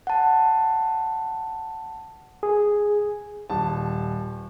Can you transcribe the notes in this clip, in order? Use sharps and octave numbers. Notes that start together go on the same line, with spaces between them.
F#5 A5
G#4
D#1 A5